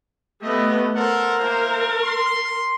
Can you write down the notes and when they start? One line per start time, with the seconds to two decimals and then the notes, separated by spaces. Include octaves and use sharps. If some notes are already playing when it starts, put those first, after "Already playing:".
0.42 A3 B3 G4 D#5
0.95 A4 A#4 C5 F#5
1.38 A#3 E4 C5
2.03 C6